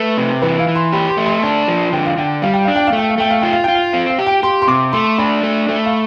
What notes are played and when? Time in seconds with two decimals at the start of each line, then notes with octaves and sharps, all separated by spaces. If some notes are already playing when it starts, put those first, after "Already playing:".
Already playing: A3 B4
0.18 C3
0.42 E3 B4
0.60 F5
0.68 E3
0.75 C6
0.93 G4 B5
1.09 C6
1.17 A3
1.26 C6
1.43 D4 A5
1.68 F3
1.93 D3 G5
2.06 F5
2.17 D3 G5
2.42 G3 F5
2.54 G5
2.65 D4 F5
2.76 G5
2.87 F5
2.93 A3 G5
3.09 F5
3.18 A3 G5
3.30 F5
3.41 F4 G5
3.53 F5
3.64 F4 G5
3.75 F5
3.93 C4 F5
4.10 F5
4.18 G4
4.26 G5
4.43 G4 C6
4.62 C6
4.68 C3 D6
4.93 A3 C6
5.18 D4 B5
5.43 A3
5.69 A3
5.86 F5